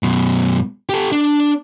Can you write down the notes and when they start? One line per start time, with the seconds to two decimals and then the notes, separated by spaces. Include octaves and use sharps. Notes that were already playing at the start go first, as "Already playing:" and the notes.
0.03 F#2 B2
0.89 G4 A4
1.12 D4